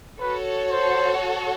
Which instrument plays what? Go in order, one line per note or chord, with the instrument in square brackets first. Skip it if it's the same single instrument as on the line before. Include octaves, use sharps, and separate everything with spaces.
[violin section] F#4 A4 C#5 [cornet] B4
[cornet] C5